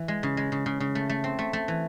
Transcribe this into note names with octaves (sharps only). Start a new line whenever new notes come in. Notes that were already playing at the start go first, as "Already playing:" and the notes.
Already playing: E3
G#3
C#3
G#3
C#3
C#3
C#3
A3
A3
C4
A3
A3
E3